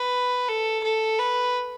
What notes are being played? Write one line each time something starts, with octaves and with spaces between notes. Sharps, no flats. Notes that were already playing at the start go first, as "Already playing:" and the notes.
Already playing: B4
A4
A4
B4